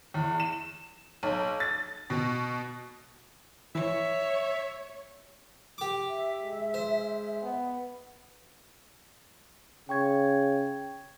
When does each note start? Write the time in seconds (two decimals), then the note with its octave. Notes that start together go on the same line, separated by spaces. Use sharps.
0.14 E2
0.40 E7
1.23 B1
1.60 A6
2.10 B2
3.75 E3 C#5 E5
5.78 G4 D6
6.08 E5
6.43 G#3
6.74 C5
7.43 B3
9.89 C#3 G5 C#6 G#6